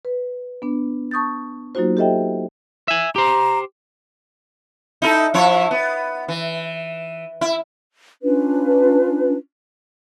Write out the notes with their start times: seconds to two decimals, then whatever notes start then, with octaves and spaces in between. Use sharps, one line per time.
0.05 B4
0.62 B3 D4
1.11 A5 C#6 D#6 G6 A6
1.75 F#3 A#3 D#4 F4 F#4 C5
1.97 G4 A4 C5 D#5 E5 G5
2.88 E5 G#5
3.16 G4 C5 A#5
5.02 D#4 E4 A4
5.34 F3 E4 C#5
5.71 B3
6.28 E3
7.41 E4
8.23 C#4 D4 F4 B4